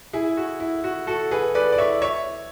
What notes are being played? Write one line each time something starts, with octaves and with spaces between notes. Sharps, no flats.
E4 G#4
F#4
E4
F#4
F#4 A4
G#4 B4
B4 D5
D5
C#5 E5
C#5 E5